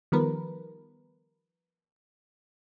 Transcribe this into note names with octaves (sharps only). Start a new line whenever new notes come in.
D#3 F3 G3 B3 A#4 B4